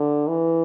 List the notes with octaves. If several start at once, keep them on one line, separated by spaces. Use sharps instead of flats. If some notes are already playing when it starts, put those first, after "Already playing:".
Already playing: D3
E3